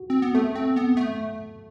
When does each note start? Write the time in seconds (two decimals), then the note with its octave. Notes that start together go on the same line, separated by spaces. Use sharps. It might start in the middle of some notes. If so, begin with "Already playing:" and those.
Already playing: F#4
0.10 C4
0.22 B3
0.35 A3 A4
0.55 C4
0.76 B3
0.97 A3